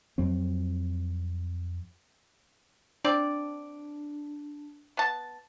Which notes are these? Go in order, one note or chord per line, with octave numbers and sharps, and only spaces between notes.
F2 F#3 C4
C4 D4 D5
B3 A5